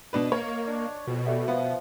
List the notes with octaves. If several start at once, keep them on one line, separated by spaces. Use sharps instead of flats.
B2 D4 B4 D#5
A#3 C#5
D4
F2 B2
G3 A3 D#5 E5 A5
F3 B3